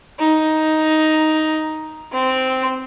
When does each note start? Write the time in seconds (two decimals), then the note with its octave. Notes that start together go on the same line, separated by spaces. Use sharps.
0.19 D#4
2.12 C4